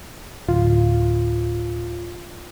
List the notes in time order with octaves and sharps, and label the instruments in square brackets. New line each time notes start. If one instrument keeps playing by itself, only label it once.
[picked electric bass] D1 [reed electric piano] F4